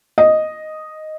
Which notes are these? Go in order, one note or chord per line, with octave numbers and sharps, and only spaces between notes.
D#5